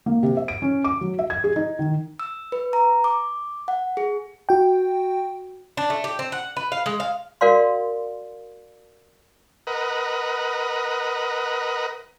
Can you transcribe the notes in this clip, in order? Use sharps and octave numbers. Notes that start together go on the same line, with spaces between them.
A#3
C3
E5
D7
C#4
D6
F#3
E5
G#6
G#4
D#4
D#3
E6
B4
A#5
D6
F#5
G#4
F#4 G5
D4
A3
G4
C4
F#5
B4
F5
G#3
F5
F#4 A#4 D5 F5 C6
A#4 B4 D#5 F#5